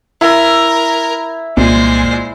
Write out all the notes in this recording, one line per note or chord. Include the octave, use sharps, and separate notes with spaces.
E4 A#4
C2 A#2 G#3 C5